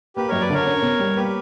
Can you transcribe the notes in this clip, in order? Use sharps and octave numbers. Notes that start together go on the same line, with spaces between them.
A#3 G4 B4
F#2 A#4 C#5
B4 D5
D3 A#4 C#5
C#4
B2
G3
A#3 G4 B4